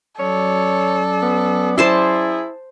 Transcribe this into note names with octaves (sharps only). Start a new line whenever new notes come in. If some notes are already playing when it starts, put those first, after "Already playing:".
F#3 C#4 A4 C#5 D5
B3
E4 G#4 C5 A5 C6